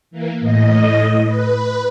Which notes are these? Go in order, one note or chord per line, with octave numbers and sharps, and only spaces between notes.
E3 A#3
A2 D#5
B4